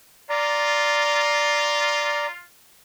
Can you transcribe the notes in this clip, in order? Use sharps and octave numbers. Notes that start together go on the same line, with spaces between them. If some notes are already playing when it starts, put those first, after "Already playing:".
F4 D5 A#5